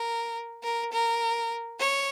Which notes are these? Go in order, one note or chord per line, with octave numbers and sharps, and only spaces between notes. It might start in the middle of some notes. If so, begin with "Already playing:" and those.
Already playing: A#4
A#4
A#4
C#5